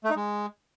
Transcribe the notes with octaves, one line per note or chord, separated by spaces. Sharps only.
A3
D#4
G#3